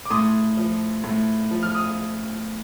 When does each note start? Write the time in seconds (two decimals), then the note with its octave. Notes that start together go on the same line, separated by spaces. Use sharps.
0.05 D6
0.10 A2 C6 D#6
0.57 F3
1.04 A2
1.51 F3
1.63 F6
1.75 D#6